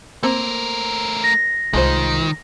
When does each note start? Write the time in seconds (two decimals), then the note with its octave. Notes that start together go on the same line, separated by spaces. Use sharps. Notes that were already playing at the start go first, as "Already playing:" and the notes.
0.23 A3 A#3 C4 A#4
1.24 A#6
1.73 C2 D#3 G#3 F4 C5